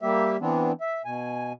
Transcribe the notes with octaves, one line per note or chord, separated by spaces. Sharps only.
G3 A#3 G4 E5
E3 B3 C4 D4
E5
B2 G#5